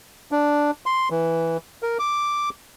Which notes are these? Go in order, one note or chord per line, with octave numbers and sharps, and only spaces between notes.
D4
C6
E3
A#4
D6